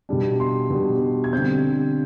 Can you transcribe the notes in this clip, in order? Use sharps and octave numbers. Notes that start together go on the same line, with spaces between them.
B2 G3 D4
C6
B2 G3 D4
G#6
D3 G3 C4 G6